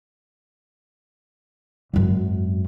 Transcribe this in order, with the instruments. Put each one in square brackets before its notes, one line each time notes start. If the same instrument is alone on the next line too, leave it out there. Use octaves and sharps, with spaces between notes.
[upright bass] G#1 F#2